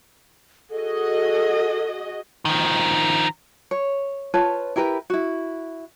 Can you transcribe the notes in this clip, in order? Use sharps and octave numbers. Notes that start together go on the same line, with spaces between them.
F#4 G#4 A4 D#5
D#3 F3
C#5
F4 B4 C#5 A5
E4 G4 A#4 B4
E4 F#4